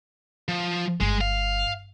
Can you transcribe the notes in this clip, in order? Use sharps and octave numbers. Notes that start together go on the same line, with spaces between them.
F3
G1 G#3
F5